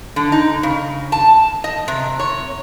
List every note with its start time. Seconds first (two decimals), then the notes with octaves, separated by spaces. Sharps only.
0.16 D3
0.32 D#4
0.63 C#3
1.12 A5
1.64 D#5
1.88 C3
2.19 C#5